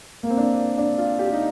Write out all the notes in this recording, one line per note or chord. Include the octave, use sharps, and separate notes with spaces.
A#3
C4
D4
D4
F4
G4
D#4